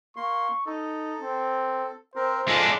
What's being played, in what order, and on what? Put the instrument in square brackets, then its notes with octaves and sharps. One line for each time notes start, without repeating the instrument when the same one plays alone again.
[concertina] A#3 C6 [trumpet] C#6
[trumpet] D#4 [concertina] A4
[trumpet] C4
[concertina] C4 A#4 [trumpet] C5
[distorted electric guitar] G#3 D4 [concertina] F4 A4